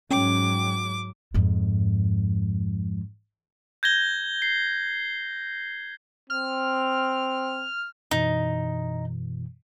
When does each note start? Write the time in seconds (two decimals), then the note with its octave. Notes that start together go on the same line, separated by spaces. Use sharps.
0.11 G#2 F#3 C#4 G5 D6
1.34 F2 G#2
3.83 G6 G#6 A#6 G7
4.42 C7
6.30 C4 F6
8.11 F#2 B2 E3 D#4